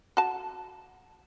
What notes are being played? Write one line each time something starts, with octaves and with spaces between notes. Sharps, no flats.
F#4 A5